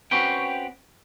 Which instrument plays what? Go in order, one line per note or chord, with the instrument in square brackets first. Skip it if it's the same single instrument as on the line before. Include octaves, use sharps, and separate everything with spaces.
[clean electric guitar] C4 C#4 F#4 G4 B4 G5